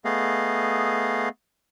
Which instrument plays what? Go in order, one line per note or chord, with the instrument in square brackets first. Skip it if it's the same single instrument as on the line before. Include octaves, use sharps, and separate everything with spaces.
[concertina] A3 B3 G#4 D#5 F5